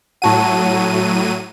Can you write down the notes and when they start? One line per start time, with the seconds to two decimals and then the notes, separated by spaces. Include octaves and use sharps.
0.22 A2 F#3 F#5 A5 C#6 D#7